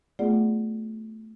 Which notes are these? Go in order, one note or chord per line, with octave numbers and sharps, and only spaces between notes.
A3 B3 F4 G#4 D5 F#5